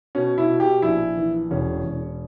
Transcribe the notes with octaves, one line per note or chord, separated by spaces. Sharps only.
B2 C#4
E4
B2
G4
A#1 E4
E3
E1 C#4
E1